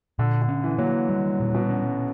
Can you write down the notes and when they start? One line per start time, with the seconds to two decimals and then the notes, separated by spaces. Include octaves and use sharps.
0.19 A#2 D3
0.42 D3
0.49 C#4
0.64 E3
0.78 F#3 A#3
0.87 E3
1.09 G3
1.40 A#2
1.54 B2
1.70 C#4